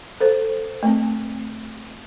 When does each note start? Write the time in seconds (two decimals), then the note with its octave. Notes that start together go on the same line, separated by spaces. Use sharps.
0.20 A4 C5
0.83 A3 C4